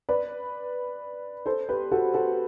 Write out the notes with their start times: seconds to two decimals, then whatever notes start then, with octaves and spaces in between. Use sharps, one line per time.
0.09 B4 D5
1.46 A4 C5
1.69 G4 B4
1.91 F#4 A4
2.14 F#4 A4